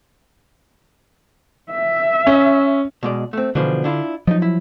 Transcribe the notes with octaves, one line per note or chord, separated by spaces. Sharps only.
E5
C#4
B2 G#3 D5
A3 C4
B2 D3 E3 F3
D4 E4 F4
F3 F#3 D#4 D#5
E4